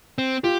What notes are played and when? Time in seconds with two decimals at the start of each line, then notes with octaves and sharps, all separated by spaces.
0.18 C4
0.44 F4 G4